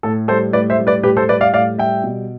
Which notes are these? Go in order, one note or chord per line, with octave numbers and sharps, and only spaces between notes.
A2 A4
G3 A4 C5
A2 B4 D5
C5 E5
G3
B4 D5
A2 G4 B4
A4 C5
G3 B4 D5
D5 F5
A2 D5 F5
G3 E5 G5
B2